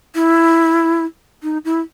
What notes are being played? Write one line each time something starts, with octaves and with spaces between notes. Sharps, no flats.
E4
D#4
E4